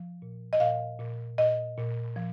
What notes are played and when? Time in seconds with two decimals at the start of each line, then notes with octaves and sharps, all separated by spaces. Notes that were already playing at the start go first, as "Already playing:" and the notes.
Already playing: F3
0.22 A#2
0.53 D#5
0.60 A#2 F5
0.99 A#2
1.38 A#2 D#5
1.78 A#2
2.16 F3